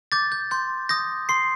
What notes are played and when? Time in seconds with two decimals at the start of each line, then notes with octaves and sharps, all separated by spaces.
0.12 D6 G6 A6
0.32 G6
0.51 C6 G6
0.89 D#6 G6 A#6
1.29 C6 C7